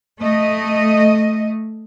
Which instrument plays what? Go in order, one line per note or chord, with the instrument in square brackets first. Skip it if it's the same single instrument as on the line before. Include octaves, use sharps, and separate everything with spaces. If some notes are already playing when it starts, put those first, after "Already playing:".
[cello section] A3 D#5